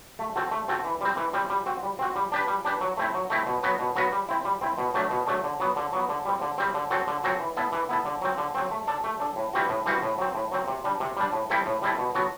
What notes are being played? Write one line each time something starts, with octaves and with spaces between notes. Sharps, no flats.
A3
C4 F#4 A4
A3
C4 F#4 A4
E3
G3 C4
E3
G3 C4
G3
C4 F#4
G3
C4 F#4
G3
D4 G4 B4
G3
D4 G4 B4
F#3
A3 C4 E4
F#3
A3 C4 E4
B2
F#3 B3 F#4 B4
B2
F#3 B3 F#4 B4
G3
C4 E4
G3
C4 E4
B2
F#3 A3 D4
B2
F#3 A3 D4
D3
F#3 B3
D3
F#3 B3
D3
G3 C4
D3
G3 C4
D3
F#3 C4 F#4 A4
D3
F#3 C4 F#4 A4
E3
B3 E4 A4
E3
B3 E4 A4
D3
F#3 C4
D3
F#3 C4
A3
D4 A4
A3
D4 A4
A2
E3 G3 C4 F#4
A2
E3 G3 C4 F#4
A2
F#3 C4
A2
F#3 C4
C3
G3 D4
C3
G3 D4
A2
G3 C4 E4 A4
A2
G3 C4 E4 A4
B2
F#3 B3 F#4 A4